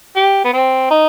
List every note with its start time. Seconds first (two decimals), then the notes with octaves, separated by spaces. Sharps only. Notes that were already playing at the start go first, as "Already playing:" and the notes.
0.16 G4
0.44 B3
0.53 C4
0.91 D#4